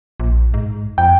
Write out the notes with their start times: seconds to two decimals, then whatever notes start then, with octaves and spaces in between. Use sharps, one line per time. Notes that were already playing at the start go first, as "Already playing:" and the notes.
0.20 A#1
0.54 G#2
0.98 F2 G5